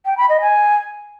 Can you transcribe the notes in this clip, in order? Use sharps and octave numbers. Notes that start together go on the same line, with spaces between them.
G5
B5
D#5
G#5